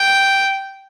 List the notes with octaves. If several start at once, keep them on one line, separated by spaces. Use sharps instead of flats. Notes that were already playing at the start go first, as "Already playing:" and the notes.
Already playing: G5